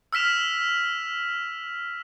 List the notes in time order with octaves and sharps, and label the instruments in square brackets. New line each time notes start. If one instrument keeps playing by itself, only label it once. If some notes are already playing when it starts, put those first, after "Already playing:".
[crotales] E6 F6 B6 E7 F7